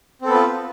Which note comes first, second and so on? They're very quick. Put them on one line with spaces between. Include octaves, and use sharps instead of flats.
C4 A4 B3 B4 F4